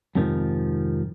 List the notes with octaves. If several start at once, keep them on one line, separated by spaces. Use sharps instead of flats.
F2 G#2 C3 D#3 F3